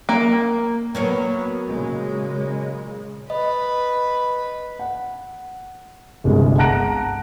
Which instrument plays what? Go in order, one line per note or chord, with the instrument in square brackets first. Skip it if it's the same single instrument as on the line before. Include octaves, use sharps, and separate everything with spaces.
[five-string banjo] A#3
[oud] F#3 A#3 C#4 [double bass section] B3
[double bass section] A#2 C#3 G#3
[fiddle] B4 [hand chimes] D#5
[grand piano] F#5
G1 C2 G#3
F#5 A5 A#5 F#6 A#6 D7